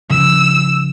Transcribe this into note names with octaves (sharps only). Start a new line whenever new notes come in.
C#3 F3 E6